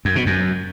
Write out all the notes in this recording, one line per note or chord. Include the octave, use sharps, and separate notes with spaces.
F#2
B2
F#2